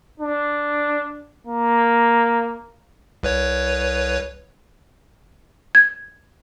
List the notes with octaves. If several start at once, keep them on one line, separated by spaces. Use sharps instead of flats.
D4
A#3
C2 B4 C#5
G#6